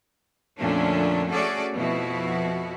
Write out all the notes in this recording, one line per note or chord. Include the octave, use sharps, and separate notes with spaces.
F2 A#2 D3 A3 C#4 D4
A3 C#4 F#4 G#4 A4 D5
F2 B2 F3 B3 E4 F#4